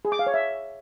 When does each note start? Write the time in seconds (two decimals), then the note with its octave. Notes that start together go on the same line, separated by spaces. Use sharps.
0.05 G#4
0.12 D6
0.19 F5
0.27 C#5
0.34 E5